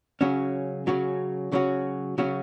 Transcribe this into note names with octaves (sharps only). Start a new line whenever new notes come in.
C#3 F#3 C#4 F#4
C#3 F#3 C#4 F#4
C#3 F#3 C#4 F#4
C#3 F#3 C#4 F#4